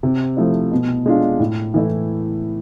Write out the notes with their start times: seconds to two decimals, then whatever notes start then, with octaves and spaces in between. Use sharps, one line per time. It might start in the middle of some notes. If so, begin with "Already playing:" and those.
0.03 C3
0.37 F3 A3 E4
0.71 B2
1.06 G#3 D4 F4
1.40 A2
1.74 E3 A3 E4